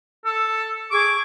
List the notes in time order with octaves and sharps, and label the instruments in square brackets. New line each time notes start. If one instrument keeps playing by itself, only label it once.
[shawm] A4
[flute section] G#4 C#6 [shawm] D6